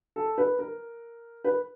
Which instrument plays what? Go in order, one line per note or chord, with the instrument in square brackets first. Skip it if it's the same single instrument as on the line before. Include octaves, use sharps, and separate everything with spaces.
[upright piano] A4
B4
A#4
B4